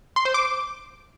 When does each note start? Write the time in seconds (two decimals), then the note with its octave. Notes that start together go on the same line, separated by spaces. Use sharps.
0.16 C6
0.25 C5
0.34 D6